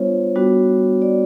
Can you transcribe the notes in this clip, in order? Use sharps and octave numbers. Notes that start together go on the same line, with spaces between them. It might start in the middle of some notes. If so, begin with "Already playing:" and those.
Already playing: G3 B3 D4 F4 C5 C#5
G3 B3 D4 F#4
D5